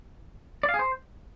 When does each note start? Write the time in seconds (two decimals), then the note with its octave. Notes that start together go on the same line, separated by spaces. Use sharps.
0.63 D5
0.69 F5
0.74 G#4
0.79 C5